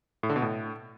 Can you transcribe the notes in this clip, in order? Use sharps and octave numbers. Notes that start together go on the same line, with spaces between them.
A2
D3
B2
A2